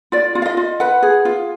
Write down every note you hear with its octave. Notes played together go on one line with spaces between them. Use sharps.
F4 D5
F4
F5
D#5
F4
B4 F#5
G#4
F4